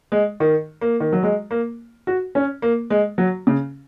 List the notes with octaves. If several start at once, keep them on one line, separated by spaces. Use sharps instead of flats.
G#3
D#3
A#3
D#3
F#3
G#3
A#3
F#4
C#4
A#3
G#3
F#3
C#3